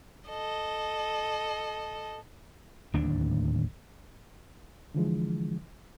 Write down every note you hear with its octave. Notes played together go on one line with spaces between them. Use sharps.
A4 D#5
D1 D#2 A2 D4
D3 E3 F3 G#3